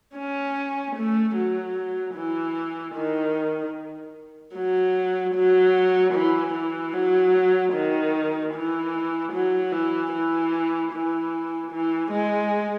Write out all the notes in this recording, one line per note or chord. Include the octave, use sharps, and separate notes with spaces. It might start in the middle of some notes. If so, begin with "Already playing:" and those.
C#4
A3
F#3
E3
D#3
F#3
F#3
E3
E3
F#3
D#3
E3
F#3
E3
E3
E3
E3
G#3